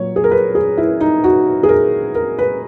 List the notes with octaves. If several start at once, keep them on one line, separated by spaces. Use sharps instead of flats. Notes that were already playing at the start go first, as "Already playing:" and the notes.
Already playing: A#2 F#3 C#5
G#4
A#4
B4
G#4
E4
D#4
F#4
G#4
A#4
A#4
B4